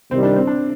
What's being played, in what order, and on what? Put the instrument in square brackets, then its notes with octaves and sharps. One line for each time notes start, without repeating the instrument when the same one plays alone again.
[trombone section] C2 C3 D#3 G3 [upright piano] C4
[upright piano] D4
C4
D4